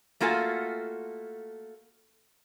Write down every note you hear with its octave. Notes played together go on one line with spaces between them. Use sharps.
A3 A#3 F4 F#4 A4 G#5